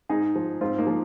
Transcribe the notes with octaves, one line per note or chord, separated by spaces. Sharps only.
G#2 D#4 G#4
F3
G#2 C4 F4
A#3 D#4
F3